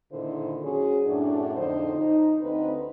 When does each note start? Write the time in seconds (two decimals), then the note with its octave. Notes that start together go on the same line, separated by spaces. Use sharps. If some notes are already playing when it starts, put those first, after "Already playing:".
0.12 A#2 D3 D#3 E4 C5
0.62 F#3 C#4 F#4 G#4
1.06 F#2 A2 D4
1.57 F2 D3 D#4 C5
1.96 D#4
2.41 D2 C4 D#4 B4